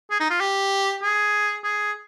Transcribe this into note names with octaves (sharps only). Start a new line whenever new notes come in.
G#4
D#4
F4
G4
G#4
G#4